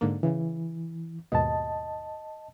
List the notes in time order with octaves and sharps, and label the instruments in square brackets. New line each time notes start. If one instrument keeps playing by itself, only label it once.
[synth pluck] G#2 D3 A#3
[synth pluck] C#3 [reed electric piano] E3
[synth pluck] D#2 G#2 B2 [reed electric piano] D#5 A5